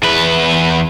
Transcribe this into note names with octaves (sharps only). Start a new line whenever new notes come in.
E2 B4